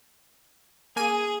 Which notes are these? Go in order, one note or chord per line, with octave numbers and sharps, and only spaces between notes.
A#3 G#4 G#5 D#7